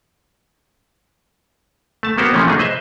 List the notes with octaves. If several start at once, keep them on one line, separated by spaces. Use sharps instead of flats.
A3 A5
A#3 B3 F#4 G4 C5
C3 E3 F3 A3 A#3 C#4
F#3 A3 A#3 D4 D#4 G#4
B4 C5 D#5 E5